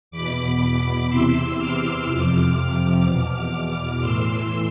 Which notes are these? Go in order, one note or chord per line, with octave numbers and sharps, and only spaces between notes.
E2 B2 B5 D6
B5 D6
E2 C3 E3 C6 E6
D6 F6
F2 C3 F3 D6 F6
D6 F6
E2 B2
A2 E3 C6 E6